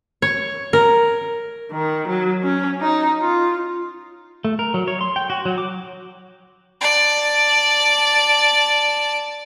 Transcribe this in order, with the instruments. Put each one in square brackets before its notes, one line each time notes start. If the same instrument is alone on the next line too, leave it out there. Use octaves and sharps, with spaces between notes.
[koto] C#5
A#4
[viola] D#3
F#3
C#4
D#4
F4
[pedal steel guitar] A3
A#4
F#3
C#5
C6
G5
F#4
F#3
D6
[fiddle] D5 A5